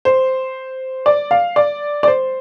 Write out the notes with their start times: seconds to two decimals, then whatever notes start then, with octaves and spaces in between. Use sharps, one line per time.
0.05 C5
1.06 D5
1.31 F5
1.56 D5
2.03 D5
2.07 C5